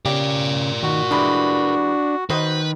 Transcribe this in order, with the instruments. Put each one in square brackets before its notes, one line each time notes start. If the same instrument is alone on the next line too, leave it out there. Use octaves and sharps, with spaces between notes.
[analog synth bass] C#3 [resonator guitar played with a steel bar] G4 [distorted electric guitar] A#4 D5
[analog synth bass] D#3 [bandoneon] F#4
[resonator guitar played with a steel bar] E3 G3 G#3 [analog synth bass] D4
[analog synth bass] D#3 [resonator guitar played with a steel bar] F#4 C5 D#5 [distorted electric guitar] B4